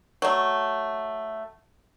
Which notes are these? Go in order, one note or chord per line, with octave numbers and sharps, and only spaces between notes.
F#3 A3